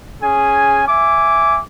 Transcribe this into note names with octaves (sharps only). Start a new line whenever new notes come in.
C#4 G#4 G#5
E5 G#5 D6